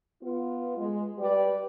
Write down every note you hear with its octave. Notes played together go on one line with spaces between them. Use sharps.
B3 F4
G#3
G3 G4 B4 D5